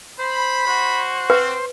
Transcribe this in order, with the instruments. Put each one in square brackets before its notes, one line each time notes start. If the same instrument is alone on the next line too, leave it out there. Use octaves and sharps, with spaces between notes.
[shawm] C5 [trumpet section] B5
[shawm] F#4 [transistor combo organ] C5
[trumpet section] C4 [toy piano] B4